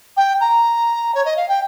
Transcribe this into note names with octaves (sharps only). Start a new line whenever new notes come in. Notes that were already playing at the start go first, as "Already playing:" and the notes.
G5
A#5
C#5
D#5
F5
G5